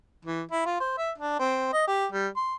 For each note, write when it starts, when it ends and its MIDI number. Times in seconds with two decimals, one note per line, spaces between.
0.25 0.42 52
0.51 0.63 64
0.66 0.76 65
0.80 0.94 72
0.98 1.11 76
1.18 1.38 62
1.40 1.70 60
1.73 1.85 75
1.88 2.06 67
2.12 2.28 55
2.36 2.55 84